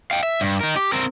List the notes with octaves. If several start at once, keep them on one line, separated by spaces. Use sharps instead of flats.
F5 G5
E5
G2
D#4 A#4
G4
C4 A#4